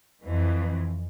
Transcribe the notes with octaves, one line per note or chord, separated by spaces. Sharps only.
F2 E3